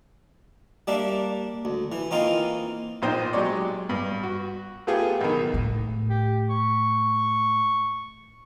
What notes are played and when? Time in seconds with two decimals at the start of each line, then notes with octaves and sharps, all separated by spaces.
0.87 G3 A#3 D4 E5
1.65 D2
1.92 E3
2.11 E3 A#3 C4 D#4 F4
3.02 A#1 A#2 D#4 C5 G5
3.33 F#3 G#3 G4 C#5 D5
3.89 G2
4.23 F#4
4.87 A3 B3 F4 G4 G#4
5.21 B1 D#3
5.54 A2
6.09 G4
6.49 C#6